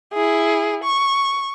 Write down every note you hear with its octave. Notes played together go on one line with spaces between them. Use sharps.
E4 G#4
C#6